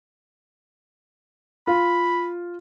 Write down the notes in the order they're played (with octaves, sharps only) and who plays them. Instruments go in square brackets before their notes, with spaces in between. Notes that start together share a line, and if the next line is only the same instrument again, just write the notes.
[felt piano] F4 [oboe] B5